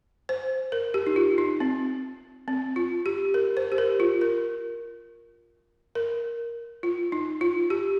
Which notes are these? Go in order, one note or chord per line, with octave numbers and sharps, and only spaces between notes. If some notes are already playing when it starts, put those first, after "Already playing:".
C5
A#4
G4
D#4
F4
D#4
C4
C4
F4
G4
A#4
C5
G4
A#4
F4
A#4
A#4
F4
D#4
F4
G4